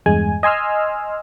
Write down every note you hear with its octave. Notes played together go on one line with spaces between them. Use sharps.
E2 G2 G#3 G#5
D#5 G#5 C6 E6 F6